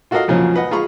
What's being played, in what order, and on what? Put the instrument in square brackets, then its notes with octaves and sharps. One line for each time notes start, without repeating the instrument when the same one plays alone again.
[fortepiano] F4 F#4 A4 A#4 D#5 F5
A#1 F2 A#2 C#3 F3 F#3
B4 D#5 F#5
F4 G#4 A#5 B5 C#6